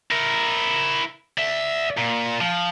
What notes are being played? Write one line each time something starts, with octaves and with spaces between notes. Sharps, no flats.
E4 A#4
D5 E5
A#2
F3